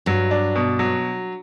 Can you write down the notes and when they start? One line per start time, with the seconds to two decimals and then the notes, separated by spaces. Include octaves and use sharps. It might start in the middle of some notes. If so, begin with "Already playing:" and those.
0.06 G2 F#3
0.31 D4
0.55 B2
0.79 F#3